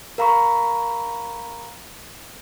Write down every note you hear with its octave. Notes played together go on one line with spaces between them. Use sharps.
A#4 F5 A#5 B5 C#6